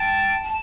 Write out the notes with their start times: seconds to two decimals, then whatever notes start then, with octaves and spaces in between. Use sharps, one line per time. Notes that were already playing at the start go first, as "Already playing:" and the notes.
Already playing: G5 A5
0.43 A5